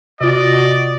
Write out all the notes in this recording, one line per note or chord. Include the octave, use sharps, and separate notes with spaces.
C3 F4 F#4 D5 D#5